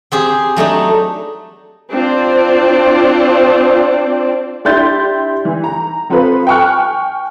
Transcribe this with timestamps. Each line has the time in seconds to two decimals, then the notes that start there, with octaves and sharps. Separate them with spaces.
0.12 C4 G4 G#4
0.57 F#3 A3 D4 D#4
1.91 C4 D4 F4 C5 D5
4.65 D4 E4 G4 C6 G6 A6
5.45 E3
5.64 A#5
6.09 F3 C4 F4 A4 B4
6.47 G5 G#5 C#6 F6 F#6